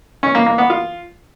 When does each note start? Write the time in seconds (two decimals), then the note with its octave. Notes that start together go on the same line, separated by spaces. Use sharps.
0.23 C#4
0.35 A#3
0.46 A#3
0.58 B3
0.70 F4